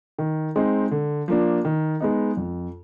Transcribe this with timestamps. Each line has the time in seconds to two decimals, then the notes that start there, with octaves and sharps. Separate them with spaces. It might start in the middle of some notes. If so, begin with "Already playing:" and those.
0.19 D#3
0.56 G#3 C4 D#4
0.91 D3
1.28 F3 A#3 D4
1.65 D#3
2.01 G#3 B3 D#4
2.37 F2